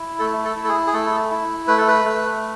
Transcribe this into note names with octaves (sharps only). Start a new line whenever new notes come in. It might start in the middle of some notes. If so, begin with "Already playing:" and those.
Already playing: E4
A3 A4
A4
E4
A4
G#4
G#4
A3 A4
E4
A3 B4
A4
B4
A3